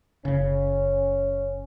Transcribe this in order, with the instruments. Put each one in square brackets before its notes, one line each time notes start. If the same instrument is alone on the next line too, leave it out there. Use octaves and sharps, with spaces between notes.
[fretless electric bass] F#1 C#3 [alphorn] C#4